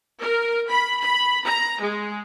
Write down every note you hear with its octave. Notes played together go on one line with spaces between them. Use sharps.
A#4
B5
B5
A#5
G#3